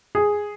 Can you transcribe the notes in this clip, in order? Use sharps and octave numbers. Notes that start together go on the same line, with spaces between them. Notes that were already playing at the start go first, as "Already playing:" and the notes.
G#4